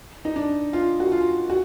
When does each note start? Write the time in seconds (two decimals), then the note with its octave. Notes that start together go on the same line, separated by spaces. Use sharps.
0.25 D#4
0.36 D4
0.73 F4
1.00 F#4
1.12 F4
1.50 F#4